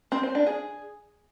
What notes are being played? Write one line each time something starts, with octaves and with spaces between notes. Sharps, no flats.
C4
C5
D4
G#4